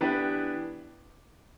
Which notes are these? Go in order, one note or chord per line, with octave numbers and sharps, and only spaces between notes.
E3 B3 D4 G4 B4